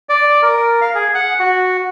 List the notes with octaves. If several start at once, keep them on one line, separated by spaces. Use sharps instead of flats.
D5
A#4
F5
G#4
F#5
F#4